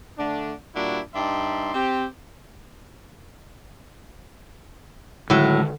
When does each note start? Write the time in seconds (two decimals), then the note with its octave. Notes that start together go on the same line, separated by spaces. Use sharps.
0.17 D3 A3 D4
0.74 A#2 G3 D4 E4 F#4
1.13 G2 D#4 D5 E5 C6
1.74 C4 G4
5.30 A2 D3 D#3 F#3 G#3